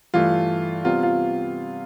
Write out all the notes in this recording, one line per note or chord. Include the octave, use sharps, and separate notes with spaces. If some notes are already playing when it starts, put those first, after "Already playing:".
G2 E3 A3 F4
C3 G3 B3 F4
F4